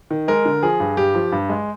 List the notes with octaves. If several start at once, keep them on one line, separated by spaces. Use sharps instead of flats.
D#3
G#3 A#4
D3
F3 G#4
G2
G2 G4
F3
G2
G#3